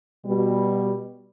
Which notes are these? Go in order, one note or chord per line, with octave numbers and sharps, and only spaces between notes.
B2 G3